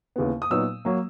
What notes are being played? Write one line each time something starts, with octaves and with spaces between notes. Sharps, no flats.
D#2 C#3 E3 B3
D#6
A#2 F#3 B3 D#4 E6
F#3 A#3